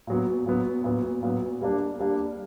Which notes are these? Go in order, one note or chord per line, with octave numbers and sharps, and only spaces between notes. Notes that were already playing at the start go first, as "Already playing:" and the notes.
A#2 F#3 B3
A#2 F#3 B3
A#2 F#3 B3
A#2 F#3 B3
G3 A#3 D4
G3 A#3 D4